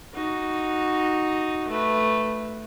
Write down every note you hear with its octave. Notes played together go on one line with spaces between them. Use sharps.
D#4 F#4
A3 B4